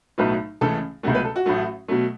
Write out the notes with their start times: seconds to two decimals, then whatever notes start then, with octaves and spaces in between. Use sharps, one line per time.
0.18 B1 A2 F#3 A3 B4
0.61 C#2 C#3 E3 A3 A4
1.03 C#2 B2 F#3 A3 F#4
1.15 B4
1.25 A4
1.36 F#4
1.46 A1 A2 F#3 A3
1.88 B2 F#3 A3